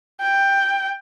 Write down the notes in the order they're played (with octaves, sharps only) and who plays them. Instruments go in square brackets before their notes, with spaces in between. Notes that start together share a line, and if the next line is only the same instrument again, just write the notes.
[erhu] G5